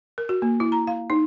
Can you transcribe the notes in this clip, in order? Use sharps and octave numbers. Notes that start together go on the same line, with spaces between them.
A#4
F#4
A#3
E4
A#5
F5
D#4